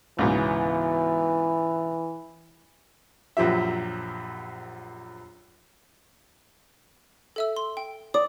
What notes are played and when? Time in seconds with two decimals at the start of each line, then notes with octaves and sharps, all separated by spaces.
0.19 C#2 G#2 B2 E3
3.37 A#1 F#2 F3 G4 E5
7.36 A4 E5 E6
7.56 C6
7.77 G5
8.14 D5 D#6